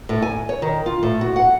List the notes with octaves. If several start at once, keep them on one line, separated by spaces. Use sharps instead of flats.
A2
G#5
C#5
D#3
F4
A2
F#4
F#5